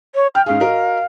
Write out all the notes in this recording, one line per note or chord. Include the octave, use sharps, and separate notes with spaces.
C#5
G5 F6
G#2 C#4 G#4 F5
F#4 A#4 D#5